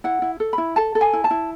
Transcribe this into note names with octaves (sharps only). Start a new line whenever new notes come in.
E4 F#5
E4
A4
B5
E4
A4 A5
A4
G#5
E4
A5
E4